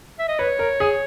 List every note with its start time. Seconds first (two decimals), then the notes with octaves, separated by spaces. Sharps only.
0.19 E5
0.29 D#5
0.39 B4 C#5
0.59 A#4
0.80 G#4